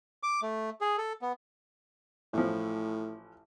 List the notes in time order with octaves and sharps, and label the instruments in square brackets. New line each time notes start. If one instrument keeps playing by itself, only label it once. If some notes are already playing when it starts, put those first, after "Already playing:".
[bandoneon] D6
A3
G#4
A4
B3
[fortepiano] A1 F3 [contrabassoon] A2